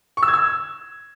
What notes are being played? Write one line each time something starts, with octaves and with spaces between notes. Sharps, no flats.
C#6
E6
G#6
E6